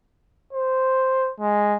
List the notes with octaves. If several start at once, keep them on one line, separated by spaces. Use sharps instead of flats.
C5
G#3